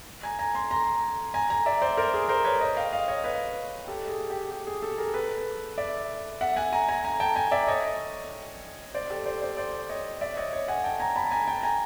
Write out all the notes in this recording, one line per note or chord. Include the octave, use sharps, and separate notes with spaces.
G#5 A#5
G#5 A#5
A#5 C6
A#5 C6
G#5 A#5
G#5 A#5
D5 E5
C5 D5
A#4 C5
G#4
A#4 C5
B4 C#5
C#5 D#5
F5 G5
D#5 F5
C#5 D#5
B4 C#5
G4 A4
G#4
G4
G4
G#4
G4 A4
G#4 A#4
A4 B4
D5 E5
E5 F#5
F#5 G#5
G#5 A#5
G#5 A#5
G#5 A#5
G5 A5
G#5 A#5
D5 E5
C#5 D#5
C5 D5
G4 A4
C5 D5
C5 D5
C5 D5
C#5 D#5
D5 E5
C#5 D#5
C#5 D#5
F#5 G#5
G5 A5
G#5 A#5
A5 B5
G#5 A#5
G5 A5
G#5 A#5